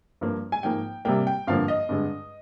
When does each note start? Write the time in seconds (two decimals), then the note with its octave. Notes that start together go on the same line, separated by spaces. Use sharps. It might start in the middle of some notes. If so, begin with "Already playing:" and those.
0.21 G2 F3 A#3
0.52 G#5
0.63 G#2 F3 A#3 G5
1.05 C3 G3 A#3 G5
1.27 G5
1.47 G2 D3 F3 A#3 F5
1.68 D#5
1.89 G2 D3 G#3